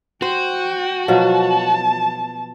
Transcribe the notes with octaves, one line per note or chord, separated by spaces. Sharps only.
F#4 C5 G5
B2 F3 F#3 A5